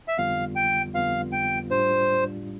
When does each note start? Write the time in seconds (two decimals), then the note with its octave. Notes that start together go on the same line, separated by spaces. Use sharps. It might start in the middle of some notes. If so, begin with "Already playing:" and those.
0.08 E5
0.18 F2 D3 G3 B3 F4 F5
0.56 G5
0.94 F2 D3 G3 B3 F4 F5
1.32 G5
1.70 A2 G3 D4 F4 C5